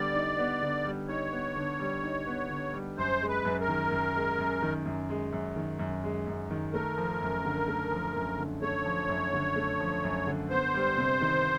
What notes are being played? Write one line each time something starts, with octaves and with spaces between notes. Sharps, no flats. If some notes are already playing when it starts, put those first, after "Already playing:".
Already playing: D3 G3 B3 D5
D#4
B3
D3
G3
D#4 C#5
B3
D3
G3
D#4
B3
D3
G3
F#2 C5
G#3
B4
F#2
A#4
D#3
F#2
G#3
F#2
D#3
F#2
G#3
F#2
D#3
F#2
G#3
F#2
D#3
A3 A#4
F3
F#2
D3
A3
F3
F#2
D3
A3 C#5
F3
F#2
D3
A3
F3
F#2
D3
B3 C5
G3
C3
D#3